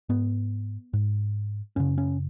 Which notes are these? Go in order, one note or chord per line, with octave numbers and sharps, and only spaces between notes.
G#2 B3
G#2
F#2 C#3 C#4
C#4